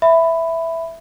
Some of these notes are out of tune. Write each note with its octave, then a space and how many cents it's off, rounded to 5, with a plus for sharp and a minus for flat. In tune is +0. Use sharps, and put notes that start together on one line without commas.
E5 +0 B5 +10